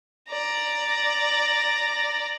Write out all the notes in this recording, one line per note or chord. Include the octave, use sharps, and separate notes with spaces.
D5 A#5